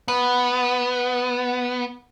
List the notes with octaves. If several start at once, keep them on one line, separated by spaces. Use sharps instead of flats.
B3 F#5